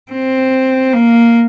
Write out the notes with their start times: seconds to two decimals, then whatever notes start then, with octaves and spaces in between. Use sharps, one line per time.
0.12 C4
0.93 A#3